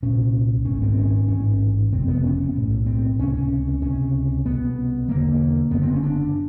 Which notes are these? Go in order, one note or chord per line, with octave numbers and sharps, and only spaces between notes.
C2 A#2 C#4
G#1 G#2 C#4
C4
C#4
A1 G#2 C#4
F#1 F2 C3 C4
B3
C#4
B1 A2
C4
C#2 C3 C#4
C#4
C#2 C3 C#4
C2 B2 B3
E1 D#2 D3 A#3
F#1 F#2 D3 B3
C4
C#4
D4